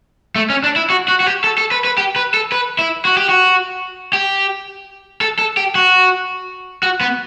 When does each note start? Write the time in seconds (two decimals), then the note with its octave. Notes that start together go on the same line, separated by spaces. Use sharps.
0.36 A3
0.50 C#4
0.64 D4
0.76 E4
0.90 F#4
1.08 F#4
1.20 F#4
1.26 G4
1.44 A4
1.58 A4
1.71 B4
1.85 B4
1.98 G4
2.16 B4
2.34 A4
2.52 B4
2.79 E4
3.05 F#4
3.17 G4
3.29 F#4
4.13 G4
5.21 A4
5.39 A4
5.57 G4
5.75 F#4
6.83 F#4
7.01 B3